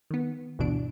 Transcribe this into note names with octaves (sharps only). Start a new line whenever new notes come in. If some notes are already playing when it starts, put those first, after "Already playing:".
D#3 B3
G1 D2 B2 E3 D4 D7